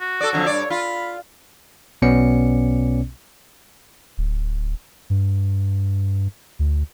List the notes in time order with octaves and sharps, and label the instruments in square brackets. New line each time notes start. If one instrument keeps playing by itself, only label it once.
[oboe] F#4
[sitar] A4 D5
F2 D3 F#3
[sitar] G2 D5 [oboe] C#5
[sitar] F4 [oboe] B5
[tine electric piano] B1 B2 B3 C#4 D5 C#7
[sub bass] D1
G2
D2